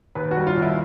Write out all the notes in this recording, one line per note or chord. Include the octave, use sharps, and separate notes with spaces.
D#2 B4
F#4
G3
F4
D#2
E4